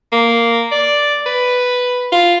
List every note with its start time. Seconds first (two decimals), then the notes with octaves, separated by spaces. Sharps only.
0.12 A#3
0.72 D5
1.26 B4
2.12 F4